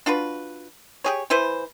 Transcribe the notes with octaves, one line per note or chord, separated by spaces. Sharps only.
D4 F4 F#4 B4
G4 G#4 C#5
E3 E4 B4 C5